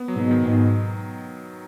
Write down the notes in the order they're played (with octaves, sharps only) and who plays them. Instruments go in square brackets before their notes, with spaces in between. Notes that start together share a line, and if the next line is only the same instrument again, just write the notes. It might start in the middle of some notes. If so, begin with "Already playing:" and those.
Already playing: [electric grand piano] B3
F#3
[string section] G#2 B2
[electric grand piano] D#3
[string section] G#2 B2
[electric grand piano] D#3